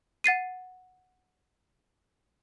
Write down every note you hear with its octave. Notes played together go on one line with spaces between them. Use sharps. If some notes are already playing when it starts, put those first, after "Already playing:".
F#5 A6 C7 D#7